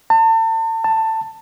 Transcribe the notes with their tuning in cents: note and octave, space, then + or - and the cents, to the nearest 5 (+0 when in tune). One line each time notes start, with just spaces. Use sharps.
A5 +35
A5 +15